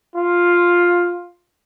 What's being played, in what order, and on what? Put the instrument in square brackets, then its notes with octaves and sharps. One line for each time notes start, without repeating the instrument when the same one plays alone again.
[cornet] F4